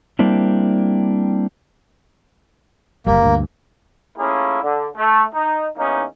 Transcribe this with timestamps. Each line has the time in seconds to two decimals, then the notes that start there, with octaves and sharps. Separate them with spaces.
0.19 G3 A#3 C4 D4 E4
3.07 F#1 C#2 G3 A#3
3.22 D2 G2
4.18 A3 A#3 C#4 E4 F4 G#4
4.62 D3
4.97 A3
5.34 D#4
5.78 E2 A#3 C#4 D#4